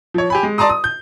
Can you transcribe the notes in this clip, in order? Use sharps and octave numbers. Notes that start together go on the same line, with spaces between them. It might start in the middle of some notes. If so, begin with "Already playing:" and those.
F3 C#5
G4 G#5 B5
G#3
D5 A5 A#5 C6 D#6
D#6
G6